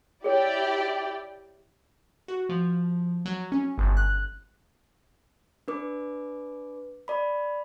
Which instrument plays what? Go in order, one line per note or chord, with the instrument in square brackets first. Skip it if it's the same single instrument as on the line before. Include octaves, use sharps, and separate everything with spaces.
[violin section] E4 G4 D5 [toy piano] G#4 C#5
[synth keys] F#4
F3
F#3
C#4
G1
F#6
[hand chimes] D4 B4 D6
D5 B5